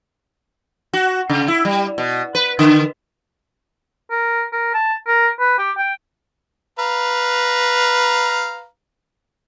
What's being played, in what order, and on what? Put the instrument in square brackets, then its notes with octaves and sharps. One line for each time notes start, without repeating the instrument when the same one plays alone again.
[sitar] F#4
C#3
E4
G3
B2
B4
D3
[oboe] A#4
A#4
A5
A#4
B4
G4
G5
[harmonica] B4 F5 A#5